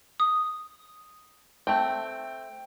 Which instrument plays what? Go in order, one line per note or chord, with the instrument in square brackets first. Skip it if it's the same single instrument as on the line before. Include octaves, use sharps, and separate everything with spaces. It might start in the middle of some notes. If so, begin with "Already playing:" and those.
[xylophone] D#6
[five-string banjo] A3 C4 [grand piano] G5